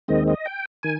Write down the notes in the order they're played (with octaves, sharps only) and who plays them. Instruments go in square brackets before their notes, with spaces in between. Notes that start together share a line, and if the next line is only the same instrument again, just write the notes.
[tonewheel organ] D#2 D#3 G#3 C4 D#5
D#5
G5
D#3 G#5